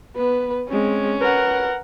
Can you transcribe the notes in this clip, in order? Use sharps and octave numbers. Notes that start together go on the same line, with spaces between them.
B3 B4
G#3 C4 C#4
A#4 B4 F#5